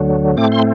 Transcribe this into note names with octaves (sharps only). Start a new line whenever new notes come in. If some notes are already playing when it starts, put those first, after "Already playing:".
Already playing: D2 D3 F#3
A2 A3 C4 D6
C6